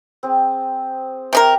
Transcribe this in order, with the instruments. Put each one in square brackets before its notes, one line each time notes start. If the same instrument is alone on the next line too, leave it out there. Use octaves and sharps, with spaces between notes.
[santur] C4 G#4
[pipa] C3 C#4 A#4 [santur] G4